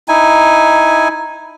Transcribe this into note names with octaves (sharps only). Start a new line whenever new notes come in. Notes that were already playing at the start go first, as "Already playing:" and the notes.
D#4 E4 G#5